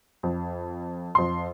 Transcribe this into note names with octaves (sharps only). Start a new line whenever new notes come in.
F2
F2 C6